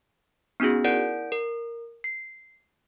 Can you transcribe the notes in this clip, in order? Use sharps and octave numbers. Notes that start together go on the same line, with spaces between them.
B3 C#4 D#4 F#4 G#4
E4 A#4 D5 F#5 G6 D7
A#4
C7